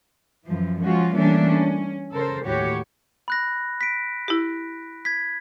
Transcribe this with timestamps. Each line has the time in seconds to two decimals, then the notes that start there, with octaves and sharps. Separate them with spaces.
0.47 F#2 E3 F3
0.83 F3 G#3 C#4 F4 F#4
1.14 E3 G3 A3 A#3 C#4 D4
1.46 C#4
2.13 C#3 A4 A#4 C5
2.45 D#2 A2 F#4 G4 C#5
3.28 B5 F#6 A#6
3.81 B6 D7
4.28 E4 G4
5.05 G#6 B6